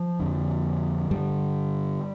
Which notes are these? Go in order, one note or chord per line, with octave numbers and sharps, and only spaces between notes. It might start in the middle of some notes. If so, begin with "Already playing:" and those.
Already playing: F3
F2 D3
G2 D3 G3